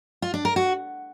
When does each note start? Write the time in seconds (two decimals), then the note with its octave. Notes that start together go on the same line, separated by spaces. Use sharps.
0.22 F4
0.34 D4
0.45 A#4
0.56 F#4